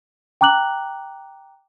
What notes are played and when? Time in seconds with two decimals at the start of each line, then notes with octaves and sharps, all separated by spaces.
0.41 G5 A#5 D6 F#6 F#7